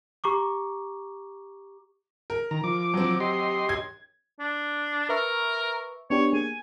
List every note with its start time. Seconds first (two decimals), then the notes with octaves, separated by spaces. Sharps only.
0.24 G4 A#5 C#6 D6
2.30 A#4
2.51 D#3 A#5
2.64 F3 D6
2.94 F#3 C4
3.20 G4 D#5 C6
3.69 G#6
4.39 D4
5.09 A#4 B4 E5 C#6
6.10 B3 D4 G4 C#5
6.33 A#3 G#4 G#5